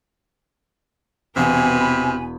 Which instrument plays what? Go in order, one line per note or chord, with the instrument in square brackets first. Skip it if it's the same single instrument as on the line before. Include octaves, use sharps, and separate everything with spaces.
[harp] E1 [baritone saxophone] C3 [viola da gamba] B3 B4 [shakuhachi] G#5
[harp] B5